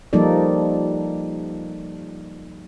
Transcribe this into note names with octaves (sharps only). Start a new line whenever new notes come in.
F3 G3 A#3 D#4 A4 D5